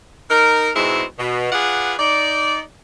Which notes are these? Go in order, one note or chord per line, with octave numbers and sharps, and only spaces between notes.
D#4 A#4
G#2 B2 G#3 C4 E4
B2
F4 G#4 B4 D5 F#5
D#4 D5